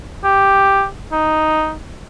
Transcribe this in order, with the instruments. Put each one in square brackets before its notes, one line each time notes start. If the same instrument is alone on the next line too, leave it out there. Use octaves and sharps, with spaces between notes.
[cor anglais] G4
D#4